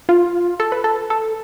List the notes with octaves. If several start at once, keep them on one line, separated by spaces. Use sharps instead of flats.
F4
A4
B4
A4
A4